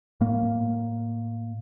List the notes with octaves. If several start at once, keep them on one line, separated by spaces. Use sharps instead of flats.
A2 A#3